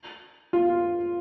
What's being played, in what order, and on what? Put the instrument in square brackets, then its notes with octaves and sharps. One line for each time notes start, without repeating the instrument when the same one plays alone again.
[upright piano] F4